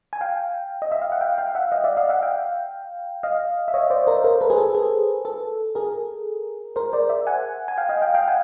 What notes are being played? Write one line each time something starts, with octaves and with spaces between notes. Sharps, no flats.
G#5
F5 G5
D#5
E5
F5
F#5
F5 G5
F5 G5
E5 F#5
D#5 F5
D5 E5
D#5 F5
E5 F#5
F5 G5
D#5 F5
E5
C#5 D#5
C5 D5
A#4 C5
A#4 C5
A4 B4
G#4
A4
G#4
A4
G#4 A#4
A#4 C5
C5 D5
D5 E5
F#5 G#5
G#5
F5 G5
D#5 F5
F5 G5
F5 G5
F#5 G#5